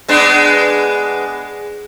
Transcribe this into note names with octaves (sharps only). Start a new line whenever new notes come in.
G#3 B3 D4